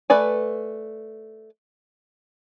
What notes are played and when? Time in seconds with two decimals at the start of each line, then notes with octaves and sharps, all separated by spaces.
0.10 A3 B4 D5 G#5